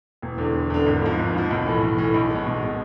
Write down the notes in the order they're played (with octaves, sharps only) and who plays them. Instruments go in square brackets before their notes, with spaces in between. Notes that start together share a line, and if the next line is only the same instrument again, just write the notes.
[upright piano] E1
E2 D3
E1
E2 D3
G#1
G#2 F3
G#1
G#2 F3
B1
A2 E3
B1
A2 E3
B1
B2 G#3
B1
B2 G#3